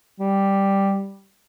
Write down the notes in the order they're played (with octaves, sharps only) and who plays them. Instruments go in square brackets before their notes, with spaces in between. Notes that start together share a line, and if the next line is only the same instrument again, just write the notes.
[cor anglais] G3